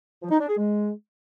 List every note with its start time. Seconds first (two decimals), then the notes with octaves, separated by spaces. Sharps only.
0.22 F3
0.31 D#4
0.40 D4
0.49 G#4
0.57 G#3